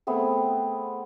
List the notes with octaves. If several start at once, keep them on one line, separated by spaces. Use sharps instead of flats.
A3 B3 C4 G#4